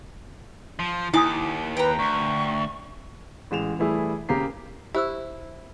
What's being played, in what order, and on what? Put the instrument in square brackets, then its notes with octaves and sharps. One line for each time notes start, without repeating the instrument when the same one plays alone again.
[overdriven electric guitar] F3
[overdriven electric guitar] D#2 [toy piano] E4 G#5 D#6 [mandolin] D6
[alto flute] B4 [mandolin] G5 A#5
[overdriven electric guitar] D2 [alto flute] C#6
[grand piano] A1 G#3 E7 F7
E3 G3 A3 E4 G#4
C#3 A#3 G4 A#5 C7
[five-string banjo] E4 [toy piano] G4 C5 E6